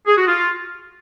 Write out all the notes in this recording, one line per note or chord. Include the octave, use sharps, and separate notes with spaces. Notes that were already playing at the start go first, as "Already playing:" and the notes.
G#4
F#4
F4